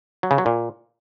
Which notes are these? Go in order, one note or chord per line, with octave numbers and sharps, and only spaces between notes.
F#3
C#3
F#3
A#2